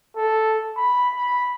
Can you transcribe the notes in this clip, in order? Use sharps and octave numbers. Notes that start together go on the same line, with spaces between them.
A4
B5
B5